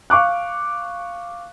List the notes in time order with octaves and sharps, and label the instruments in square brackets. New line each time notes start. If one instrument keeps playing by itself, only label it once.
[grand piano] F5 C#6 D6 F#6